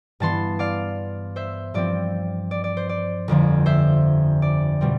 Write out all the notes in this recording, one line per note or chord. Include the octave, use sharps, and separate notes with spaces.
G2 E3 B3 A5 C6
D5 F5
C5 E5
G2 F3 C4 D5
D5
D5
C5
D5
G1 F2 D3 F3
C5 E5
D5
B2 G3 C4